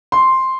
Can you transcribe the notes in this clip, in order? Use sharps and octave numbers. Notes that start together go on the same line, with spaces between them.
C6